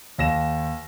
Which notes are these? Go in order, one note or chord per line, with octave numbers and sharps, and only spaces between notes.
D#2 A#6 E7